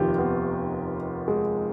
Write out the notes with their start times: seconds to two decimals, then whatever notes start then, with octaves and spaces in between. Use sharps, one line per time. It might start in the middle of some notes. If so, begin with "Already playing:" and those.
Already playing: F1 D#2 D#3 F4 G4
0.18 B3
1.28 G#3